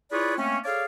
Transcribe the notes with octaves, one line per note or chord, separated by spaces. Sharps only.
E4 F4 G#4 B4 C#5 D5
A3 A#3 C4 C#4
G#4 A4 C#5 D5 F5